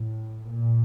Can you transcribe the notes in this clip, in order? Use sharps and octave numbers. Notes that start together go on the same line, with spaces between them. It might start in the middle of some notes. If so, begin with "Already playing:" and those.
Already playing: A2
A#2